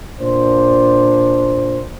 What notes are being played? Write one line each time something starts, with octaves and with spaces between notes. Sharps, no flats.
A#2 D4 C5